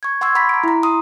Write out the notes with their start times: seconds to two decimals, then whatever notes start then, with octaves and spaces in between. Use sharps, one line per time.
0.03 C#6 G#6
0.21 F#5 C6 C#6 E6 G#6
0.35 F#5 B5 C6 D6 A6 B6
0.49 A#5 D7
0.63 E4 A#5
0.83 A#5 C6 D#6